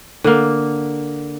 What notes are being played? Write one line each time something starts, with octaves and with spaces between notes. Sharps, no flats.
D3 A#3